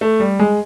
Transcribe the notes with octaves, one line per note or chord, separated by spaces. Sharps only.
A3
G3
G#3